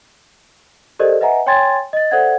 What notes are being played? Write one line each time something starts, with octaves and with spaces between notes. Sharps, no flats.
G4 A4 A#4 C5 D5 D#5
B4 D#5 E5 F#5 G#5 A#5
C#5 G5 G#5 C6 G#6 A6
D#5 A6
A4 C5 D5 E5 F#5 G#6